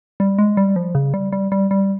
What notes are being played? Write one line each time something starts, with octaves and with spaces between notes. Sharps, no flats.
G3
G#3
G3
F3
C#3
G3
G3
G3
G3